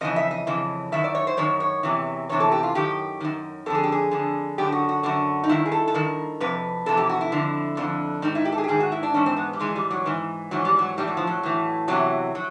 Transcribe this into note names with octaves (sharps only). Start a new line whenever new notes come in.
F2 C#3 E3 D#5
E5
D#5
F2 C#3 E3
F#2 D#3 E5
D5
C#5
C5
F#2 D#3 C#5
C#5
E2 C3 E3
E2 C3 E3 C#5
A4
G4
F4
F#2 D#3 G4
F#2 D#3
F2 D3 G#4 A4
G4
G#4
F2 D3
F#2 D3 G4
F#4
F#4
F#2 D3 F#4
D#4
G2 D#3 E4
G#4
A4
A4
G2 D#3 A#4
F2 C3 B4
F2 C3 E3 A4
G4
F#4
E4
F2 D3
F2 D3
G#2 D#3 D#4
E4
G4
A4
G#4
G4
G#2 D#3 G#4
F#4
E4
D4
G#2 E3 C#4
C4
B3
G3
G#2 E3 G#3
G3
F#3
G#2 E3
G#2 E3 F#3
G3
F#3
A2 E3 G3
F#3
F3
F#3
A2 E3
E2 C3 E3 F#3
F#3